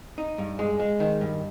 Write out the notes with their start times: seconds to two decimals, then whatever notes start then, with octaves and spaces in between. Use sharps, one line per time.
0.18 D#4
0.38 G2
0.59 G#3
0.80 G#3
1.00 D#3
1.21 G2